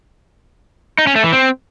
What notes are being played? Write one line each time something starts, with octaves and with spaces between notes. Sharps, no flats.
D#4
C#4
A3
E3
C4